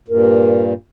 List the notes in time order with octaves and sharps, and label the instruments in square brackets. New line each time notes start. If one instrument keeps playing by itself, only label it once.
[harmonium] G2 A#2 [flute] A#4